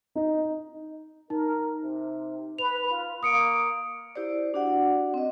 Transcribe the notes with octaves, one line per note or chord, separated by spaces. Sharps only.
D#4
D#4 A#4
C3
B4 F7
F4
A#3 D#6 C#7 D7
E4 G4 C5 D5
D4 F#4 D5 F#5
C4 D#5